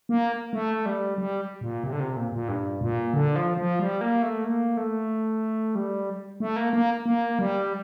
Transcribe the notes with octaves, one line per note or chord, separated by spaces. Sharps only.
A#3
A3
G3
G3
A#2
C3
D3
C3
A#2
A#2
G2
A#2
D3
F3
F3
G3
A#3
A3
A#3
A3
G3
A3
A#3
A#3
A#3
G3